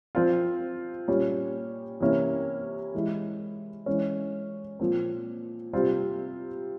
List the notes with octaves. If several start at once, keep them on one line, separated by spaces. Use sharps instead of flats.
F3 C4 F4
A#2 G3 C#4
C3 E3 A#3 C#4 E4
E3 G#3 E4
E3 G#3 C#4
A#2 F3 C4
C3 G3 C4 F4